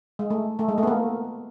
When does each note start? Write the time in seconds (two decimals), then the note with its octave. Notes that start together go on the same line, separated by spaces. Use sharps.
0.19 G#3
0.30 A3
0.59 A3
0.69 G#3
0.78 A3
0.83 B3
0.87 A#3